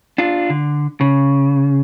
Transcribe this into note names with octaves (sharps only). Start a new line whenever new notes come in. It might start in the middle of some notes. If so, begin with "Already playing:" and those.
D4 F4
D3
C#3